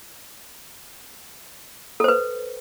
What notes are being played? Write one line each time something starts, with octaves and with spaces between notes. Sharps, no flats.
A4 B4 C5